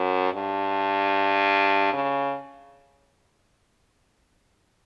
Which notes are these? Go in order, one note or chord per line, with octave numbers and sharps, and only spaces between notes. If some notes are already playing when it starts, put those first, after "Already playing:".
Already playing: F#2
G2
C#3